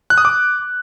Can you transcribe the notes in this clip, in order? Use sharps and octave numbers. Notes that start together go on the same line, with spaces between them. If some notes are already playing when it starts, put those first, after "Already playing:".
F#6
D#6
D6